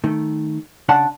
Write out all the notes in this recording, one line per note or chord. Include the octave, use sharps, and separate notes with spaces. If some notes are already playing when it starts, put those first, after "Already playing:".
D#3 A3
C#3 D4 D5 F#5 A5 C6